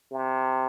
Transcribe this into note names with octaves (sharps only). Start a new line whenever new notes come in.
C3